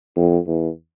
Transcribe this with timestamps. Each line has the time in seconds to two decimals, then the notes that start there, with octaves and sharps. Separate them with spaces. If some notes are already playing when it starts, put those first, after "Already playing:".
0.17 F2
0.47 E2